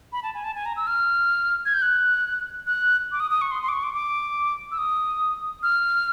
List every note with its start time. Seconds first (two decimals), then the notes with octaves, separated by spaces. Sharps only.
0.13 B5
0.23 A5
0.34 G#5
0.44 A5
0.55 G#5
0.65 A#5
0.77 E6
0.87 F6
1.65 G#6
1.74 G6
1.82 F#6
2.67 F#6
3.12 D6
3.20 D#6
3.31 D#6
3.41 C#6
3.51 C6
3.63 C6
3.69 D6
3.73 C#6
3.83 D6
3.94 D6
4.71 E6
4.78 D#6
5.63 F6